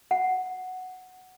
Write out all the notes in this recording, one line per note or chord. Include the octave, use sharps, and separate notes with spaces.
F#5